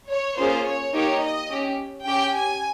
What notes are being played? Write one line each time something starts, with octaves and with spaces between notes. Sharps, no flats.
C#5
A#3 C#4 F4 G#4 C5
C#5
A#3 D#4 G4 C#5
D#5
C#4 G4
C#4 G4 G5
G#5